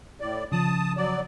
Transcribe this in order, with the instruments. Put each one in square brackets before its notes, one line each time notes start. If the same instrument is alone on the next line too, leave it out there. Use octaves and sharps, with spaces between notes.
[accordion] A2 D5
[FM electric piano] C#3 F3 [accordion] A5 D#6
[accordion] F#3 D5